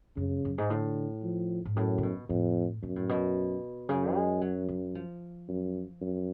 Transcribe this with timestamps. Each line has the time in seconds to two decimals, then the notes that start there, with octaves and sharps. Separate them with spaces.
0.17 F#2 C#3
0.45 F#2
0.58 G#2
0.70 A2 D3
1.23 F3
1.65 G#2
1.76 F#2 A2
1.98 C#3
2.03 B2
2.29 F2 A2
2.83 F#2 B2
2.96 A2
3.09 B2
3.89 F#2 C#3
4.15 G#3
4.41 F#3
4.69 F#3
4.95 F3
5.48 F#2
6.01 F#2